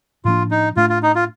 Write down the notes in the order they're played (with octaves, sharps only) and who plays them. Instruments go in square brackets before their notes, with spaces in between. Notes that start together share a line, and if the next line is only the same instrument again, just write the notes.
[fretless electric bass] A2 F3 A#3 D4 [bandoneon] F4
[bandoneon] D#4
[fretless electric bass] A2 A3 D4 [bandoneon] F4
[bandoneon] F4
D#4
F4